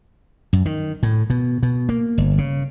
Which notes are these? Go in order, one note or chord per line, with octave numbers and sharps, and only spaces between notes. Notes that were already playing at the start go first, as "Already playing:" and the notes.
F#2
D#3
A2
B2
B2
A#3
G1
C#3